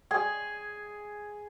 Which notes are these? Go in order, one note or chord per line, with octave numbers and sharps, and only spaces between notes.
G#4 G#5